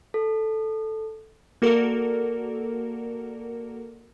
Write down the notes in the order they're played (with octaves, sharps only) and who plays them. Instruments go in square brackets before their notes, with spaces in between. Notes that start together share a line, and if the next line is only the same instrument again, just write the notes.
[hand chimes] A4
[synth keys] A#3 F#4 A4 A#4 D5